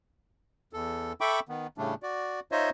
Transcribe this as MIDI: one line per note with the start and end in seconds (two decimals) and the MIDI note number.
0.73 1.13 40
0.73 1.13 69
1.21 1.40 69
1.21 1.40 76
1.21 1.40 79
1.21 1.40 83
1.21 1.40 85
1.21 1.40 86
1.49 1.67 51
1.49 1.67 59
1.78 1.95 45
1.78 1.95 49
1.78 1.95 55
1.78 1.95 57
1.78 1.95 62
2.03 2.40 66
2.03 2.40 74
2.52 2.70 63
2.52 2.70 65
2.52 2.70 72
2.52 2.70 73
2.52 2.70 75
2.52 2.70 76